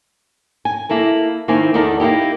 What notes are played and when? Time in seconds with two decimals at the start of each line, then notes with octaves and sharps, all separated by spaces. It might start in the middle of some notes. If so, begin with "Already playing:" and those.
0.65 G#5
0.89 A#3 E4 A4 A#4
1.48 D#3 A#3 C4 E4 G#5
1.74 E2 D#3 D#4 A4 A#4 D5
2.00 A#3 D#4 E4 G4